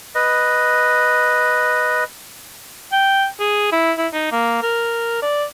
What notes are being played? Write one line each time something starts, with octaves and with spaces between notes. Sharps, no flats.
B4 D#5
G5
G#4
E4
E4
D#4
A#3
A#4
D5